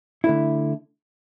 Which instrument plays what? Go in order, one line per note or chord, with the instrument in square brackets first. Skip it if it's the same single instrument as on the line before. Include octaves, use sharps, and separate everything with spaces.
[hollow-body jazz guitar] D3 A3 E4